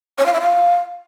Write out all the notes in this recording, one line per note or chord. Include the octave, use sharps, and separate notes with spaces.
C#5
F5
E5
F5